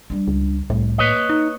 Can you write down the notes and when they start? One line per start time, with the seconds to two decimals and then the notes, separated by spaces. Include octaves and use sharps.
0.10 G3 D4
0.28 C#2
0.70 C2 A2
0.98 A#3 B4 C#5 D#5
1.30 D#4